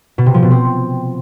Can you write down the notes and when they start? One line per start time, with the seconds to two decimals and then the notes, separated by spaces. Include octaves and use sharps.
0.18 B2
0.26 C3
0.34 F3
0.42 B2
0.51 C4